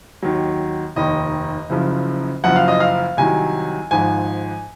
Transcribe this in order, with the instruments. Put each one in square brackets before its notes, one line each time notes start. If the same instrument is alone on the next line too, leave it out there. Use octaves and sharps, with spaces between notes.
[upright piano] D#2 D#3 F#3
F1 D#2 D#3 D#5
F#1 F#2 C#3 F3
F#1 F#2 F3 F#5
F5
D#5
F5
C2 C3 D#3 F#3 G#5
G#1 G#2 F3 G#5